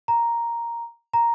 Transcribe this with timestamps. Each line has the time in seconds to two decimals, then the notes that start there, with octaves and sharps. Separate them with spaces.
0.08 A#5
1.14 A#5